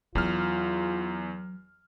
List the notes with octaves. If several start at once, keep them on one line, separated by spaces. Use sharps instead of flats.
E2 F#3 F4 F6